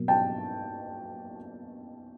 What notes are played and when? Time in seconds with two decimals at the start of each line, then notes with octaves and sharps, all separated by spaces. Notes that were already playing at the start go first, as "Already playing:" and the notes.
Already playing: B2 F#3 A#3
0.08 G5 A5